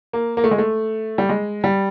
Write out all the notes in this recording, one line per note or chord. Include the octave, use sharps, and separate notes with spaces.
A#3
A#3
A3
G#3
A3
G3
G#3
G3